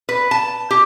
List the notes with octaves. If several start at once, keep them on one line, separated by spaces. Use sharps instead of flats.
B4
A5
G4